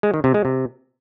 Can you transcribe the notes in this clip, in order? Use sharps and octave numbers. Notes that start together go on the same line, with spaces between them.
G#3
D#3
C3
G#3
C3